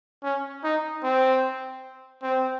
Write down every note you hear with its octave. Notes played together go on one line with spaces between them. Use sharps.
C#4
D#4
C4
C4